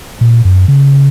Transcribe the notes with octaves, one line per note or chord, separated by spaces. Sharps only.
A#2
F#2
C#3